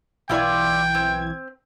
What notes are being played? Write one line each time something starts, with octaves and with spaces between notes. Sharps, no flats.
B1 E3 E4 F4 D5 G5 G#6
C4